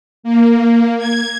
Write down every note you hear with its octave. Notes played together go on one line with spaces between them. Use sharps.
A#3
G#6